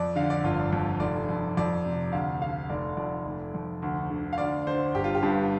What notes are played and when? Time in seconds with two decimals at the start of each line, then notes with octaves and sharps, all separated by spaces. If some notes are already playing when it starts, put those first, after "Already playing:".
Already playing: F2 D5
0.16 D3 F5
0.30 D5
0.43 G1 F4
0.73 F2
1.00 F1 D5
1.29 F2
1.57 F2 D5
1.85 C3
2.12 D2 F5
2.41 D3 F5
2.69 F1 D5
2.97 F2 D5
3.26 F1
3.54 F2
3.82 D2
4.10 D3
4.33 F5
4.38 D2 D5
4.67 D3 C5
4.95 G1 G4
5.04 F4
5.15 G4
5.23 G2